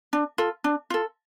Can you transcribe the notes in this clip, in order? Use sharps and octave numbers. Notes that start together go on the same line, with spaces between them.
D4
F4 A4
D4
F4 A4